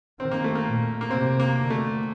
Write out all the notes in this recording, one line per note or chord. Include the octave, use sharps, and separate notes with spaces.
D#3 C4
A#3
A3
A#3
A#2
A#3
C3 C4
A#3
D3
A3